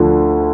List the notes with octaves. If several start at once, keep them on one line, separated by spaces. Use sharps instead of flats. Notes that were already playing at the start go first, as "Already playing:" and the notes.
Already playing: D2 D3 F3